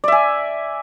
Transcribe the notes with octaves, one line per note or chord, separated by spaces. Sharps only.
D5 E5 G#5